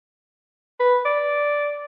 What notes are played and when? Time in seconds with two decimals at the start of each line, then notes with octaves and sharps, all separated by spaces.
0.80 B4
1.05 D5